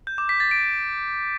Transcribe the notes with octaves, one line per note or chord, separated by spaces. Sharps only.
G6
D6
B6
A6
D7